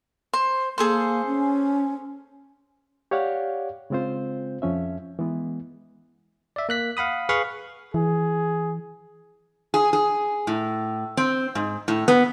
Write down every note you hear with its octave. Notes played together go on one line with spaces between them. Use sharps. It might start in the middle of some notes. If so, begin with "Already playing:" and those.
C5
A#3 G#4 A4 C5
C#4
G4 C#5 D5 F5 F#5
C#3 G#3 C4 F4 C5
F2 F3 C#4 E5
E3 G#3 B3
D5 E5
A#3 F#6 B6
F5 F#5 B5 D#6
G#4 B4 F5 B5 C#6
E3 G#4
G#4
G#4
A2
C4
G#2
A2
B3